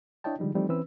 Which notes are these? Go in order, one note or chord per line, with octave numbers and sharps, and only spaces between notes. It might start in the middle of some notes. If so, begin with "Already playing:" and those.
D4 E4 C#5 D#5 G5 A5
D3 F3 G3 G#3 D#4
E3 F3 G3 A3 C4 D#4
E3 C4 C#4 B4 E6